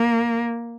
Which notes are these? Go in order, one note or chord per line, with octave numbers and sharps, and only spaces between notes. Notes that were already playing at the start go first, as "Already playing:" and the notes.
Already playing: A#3